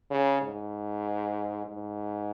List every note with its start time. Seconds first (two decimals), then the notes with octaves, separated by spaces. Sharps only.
0.11 C#3
0.42 G#2
1.66 G#2